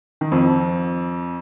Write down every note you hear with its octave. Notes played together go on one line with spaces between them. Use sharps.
D#3
F2 F3